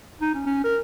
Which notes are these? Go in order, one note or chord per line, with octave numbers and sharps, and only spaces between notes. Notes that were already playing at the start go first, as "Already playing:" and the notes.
D#4
C#4
C#4
A#4